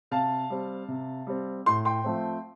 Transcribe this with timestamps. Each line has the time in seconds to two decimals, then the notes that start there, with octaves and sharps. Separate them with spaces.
0.11 C3 F5 A5
0.50 G3 C4
0.88 C3
1.27 G3 C4
1.66 A2 C6
1.85 G5 C6
2.04 F3 A3 C4